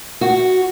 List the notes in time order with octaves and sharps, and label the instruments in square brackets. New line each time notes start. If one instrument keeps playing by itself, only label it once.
[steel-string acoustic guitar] F#4